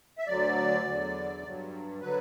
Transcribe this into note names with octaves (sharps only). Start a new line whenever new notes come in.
E5
D2 D3 F#3 D5
E2 D3 F#3
G2 F#3
D3 F#3 B4